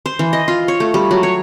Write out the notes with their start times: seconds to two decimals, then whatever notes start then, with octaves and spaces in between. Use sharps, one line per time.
0.06 C5
0.19 E3
0.33 D#5
0.48 F4
0.68 C#5
0.80 A3
0.94 G3
1.11 F#3
1.23 C#5